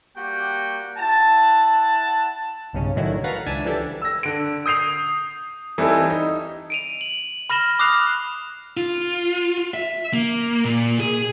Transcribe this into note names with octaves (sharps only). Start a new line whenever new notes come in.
G3 A#3 F#4 G4 G5
E4 F#5 A5
B1 G2 C#3 C#4
A2 D3 D#3 F#3 A3 E4
A4 B4 F5 F#5 A#5 C#6
C#2 D4 E5 G#5 A5 B6
E3 F3 G3 D4 G4 A4
E6 A#6
D3 D7
D#6 G6 C7 F7
E3 G3 C4 D#4 E4 A4
D#4
D7 D#7 F7
F#7
B5 F6 A#6 E7 G7
D6 D#6 F6 F#6 C7 F7
F4
E5
A#3
A#2
G#4